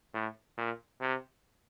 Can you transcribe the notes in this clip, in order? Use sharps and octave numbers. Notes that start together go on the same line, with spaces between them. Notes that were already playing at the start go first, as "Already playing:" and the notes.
A2
A#2
C3